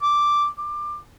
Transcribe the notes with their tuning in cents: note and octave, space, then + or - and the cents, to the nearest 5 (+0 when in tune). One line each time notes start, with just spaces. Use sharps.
D6 +0
D6 +20